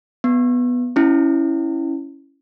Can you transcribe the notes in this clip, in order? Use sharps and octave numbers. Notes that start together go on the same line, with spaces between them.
B3
C#4 E4